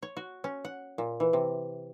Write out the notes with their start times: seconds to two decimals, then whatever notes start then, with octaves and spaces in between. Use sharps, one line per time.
0.03 C#5
0.17 F#4
0.44 C#4
0.65 F#5
0.98 A#2
1.20 E3
1.33 C3